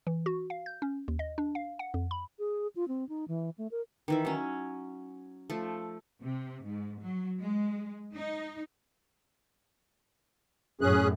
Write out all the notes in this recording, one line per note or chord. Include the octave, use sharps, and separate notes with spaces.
E3
F#4
F5
G6
C#4
D#2
D#5
D4
F5
F#5
F2
B5
G#4
F4
C4
D#4
E3
A3
A#4
D#3 E3 E5
F#3 C#4
F3 A3
C3
G#2
F#3
G#3
D#4
F#2 A2 C#4 G#4 F#6